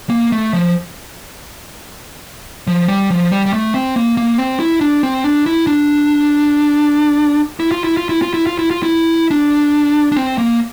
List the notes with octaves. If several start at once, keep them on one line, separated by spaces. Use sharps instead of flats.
A#3
A3
F3
F3
G3
F3
G3
G3
A3
C4
A#3
A#3
C4
E4
D4
C4
D4
E4
D4
E4
F4
E4
F4
E4
F4
E4
F4
E4
F4
E4
D4
D4
C4
A#3